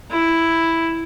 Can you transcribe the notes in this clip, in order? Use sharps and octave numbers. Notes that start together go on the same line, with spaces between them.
E4